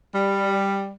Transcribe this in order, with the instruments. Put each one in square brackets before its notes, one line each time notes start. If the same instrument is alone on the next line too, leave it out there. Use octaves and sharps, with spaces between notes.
[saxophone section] G3